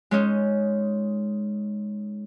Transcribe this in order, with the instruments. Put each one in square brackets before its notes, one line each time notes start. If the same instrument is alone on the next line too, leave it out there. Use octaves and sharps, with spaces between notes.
[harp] G#3 C#4 D#4